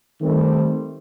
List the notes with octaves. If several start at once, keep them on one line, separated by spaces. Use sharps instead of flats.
D#3 G3 A3 C4